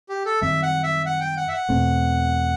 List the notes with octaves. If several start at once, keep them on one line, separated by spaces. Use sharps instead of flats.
G4
A4
F#2 D#3 G3 C4 E5
F#5
E5
F#5
G5
F#5
E5
F#5
E2 B2 A3 C4